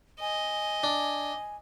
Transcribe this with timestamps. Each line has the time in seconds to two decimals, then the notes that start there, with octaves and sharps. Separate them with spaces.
0.21 D#5 G#5
0.84 D4